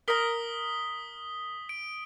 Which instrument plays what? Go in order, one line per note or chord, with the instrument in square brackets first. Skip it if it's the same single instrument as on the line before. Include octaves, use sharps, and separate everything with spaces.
[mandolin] A#4 A#5 [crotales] D#6 B6 G7
[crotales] D7